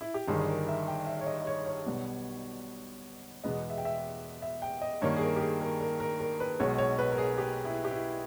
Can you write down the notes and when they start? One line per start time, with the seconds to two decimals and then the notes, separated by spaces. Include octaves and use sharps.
0.01 E4
0.14 G4
0.28 G1 G2 D#3 G3 G#4
0.40 G#4
0.48 A#4
0.68 E5
0.88 G5
1.06 E5
1.21 C#5
1.27 D#5
1.42 D#5
1.47 C#5
1.66 C#5
1.86 B1 B2 G3 B3
3.44 E2 B2 G#3 B3 D#5
3.70 E5
3.78 G5
3.85 E5
4.42 E5
4.62 G5
4.82 D#5
5.02 G2 D#3 A#3 C#5
5.16 G#4
5.21 A#4
5.36 G4
5.40 G#4
5.61 A#4
5.80 A#4
6.00 A#4
6.20 A#4
6.40 B4
6.60 B1 B2 G#3 C#5
6.78 C#5
6.99 B4
7.12 A#4
7.18 G#4
7.38 G4
7.65 E4
7.85 G4
7.91 E4